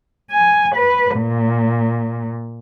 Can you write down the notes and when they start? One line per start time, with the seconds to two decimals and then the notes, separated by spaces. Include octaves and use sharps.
0.31 G#5
0.75 B4
1.16 A#2